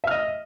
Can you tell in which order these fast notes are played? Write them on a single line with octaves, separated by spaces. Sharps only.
E5 F6 D#5